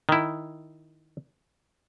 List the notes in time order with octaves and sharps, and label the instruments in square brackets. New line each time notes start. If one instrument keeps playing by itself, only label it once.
[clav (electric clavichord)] D#3 E4